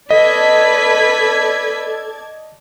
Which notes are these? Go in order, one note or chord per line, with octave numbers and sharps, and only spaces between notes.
A4 B4 D5 D#5 A5 G#6 B6